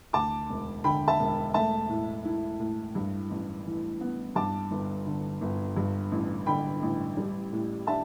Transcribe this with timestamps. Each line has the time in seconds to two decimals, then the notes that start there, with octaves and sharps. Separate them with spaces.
0.13 D2 A5 D6
0.49 E1
0.84 D3 G5 B5
1.08 E5 A5
1.19 E1
1.54 A3 E5 A5
1.89 A2
2.25 E4
2.60 A2
2.95 G2
3.30 A1
3.66 E3
4.01 B3
4.35 G2 A5 D6
4.71 G1
5.06 D3
5.41 G1
5.77 G2
6.12 A1
6.46 D3 G5 B5
6.82 A1
7.17 G3
7.53 A2
7.87 D4 E5 A5